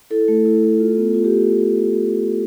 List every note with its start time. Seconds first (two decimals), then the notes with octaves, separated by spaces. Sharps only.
0.10 E4 A4
0.28 A3
0.45 E4
0.63 A3
0.80 F4
0.97 B3
1.14 F4
1.24 G4